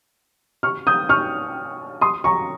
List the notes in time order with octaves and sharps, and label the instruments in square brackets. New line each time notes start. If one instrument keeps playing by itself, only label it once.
[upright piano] C#6 F6
D#6 G6
C#6 F6
C6 D#6
A#5 C#6